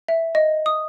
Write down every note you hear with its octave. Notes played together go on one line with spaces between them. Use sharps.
E5
D#5
D#6